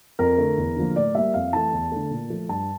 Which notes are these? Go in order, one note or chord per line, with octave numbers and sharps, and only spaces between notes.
F2 A#4
D3 A3
E2
D3 F3 A#3
A2 D5
G3 A#3 E5
F2 F5
E3 A3 A5
E2
D3 A3
A#2
F3 A3
G2 A5